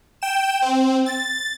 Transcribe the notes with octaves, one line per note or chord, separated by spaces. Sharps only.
G5 E7
C4
A6